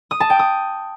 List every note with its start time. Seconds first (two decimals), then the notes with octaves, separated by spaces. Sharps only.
0.11 D#6
0.20 A5
0.30 G5
0.39 D#6